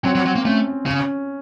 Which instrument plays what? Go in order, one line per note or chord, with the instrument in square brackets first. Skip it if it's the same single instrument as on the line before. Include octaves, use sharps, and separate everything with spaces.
[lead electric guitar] F#3 [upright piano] C4
[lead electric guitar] F#3
F#3
A#3
[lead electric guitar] A3 [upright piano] C#4
[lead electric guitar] C#3 [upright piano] C#4